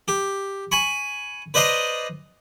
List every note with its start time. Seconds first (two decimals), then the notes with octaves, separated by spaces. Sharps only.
0.08 G4
0.72 G#5 B5 C#6
1.54 B4 C5 D5 D#5 A#5 C6